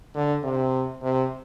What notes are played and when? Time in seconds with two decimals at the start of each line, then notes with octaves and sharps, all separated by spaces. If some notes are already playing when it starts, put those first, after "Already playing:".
0.15 D3
0.43 C3
1.02 C3